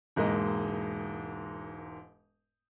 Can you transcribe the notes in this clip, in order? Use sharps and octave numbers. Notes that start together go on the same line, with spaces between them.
E1 G#2 G#3 A#3 D#5